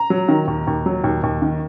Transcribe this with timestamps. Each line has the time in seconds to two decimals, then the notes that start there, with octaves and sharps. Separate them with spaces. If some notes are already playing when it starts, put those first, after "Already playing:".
Already playing: A#5
0.10 F#3
0.28 D#3
0.47 D#2
0.67 D#2
0.86 F#3
1.04 D#2
1.23 D#2
1.42 D#3